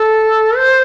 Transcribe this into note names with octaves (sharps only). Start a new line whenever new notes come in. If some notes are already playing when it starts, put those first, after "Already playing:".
Already playing: A4
C5